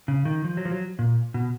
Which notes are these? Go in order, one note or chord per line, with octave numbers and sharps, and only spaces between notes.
C#3
D#3
F3
F#3
F3
F#3
A#2
B2